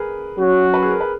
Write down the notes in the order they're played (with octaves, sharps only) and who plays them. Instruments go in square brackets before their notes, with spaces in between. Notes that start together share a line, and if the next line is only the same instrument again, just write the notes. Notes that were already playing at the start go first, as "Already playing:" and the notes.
Already playing: [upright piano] G#4 A#4 B4
[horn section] F#3 C#4 F#4
[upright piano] B4
G#4
A#4
B4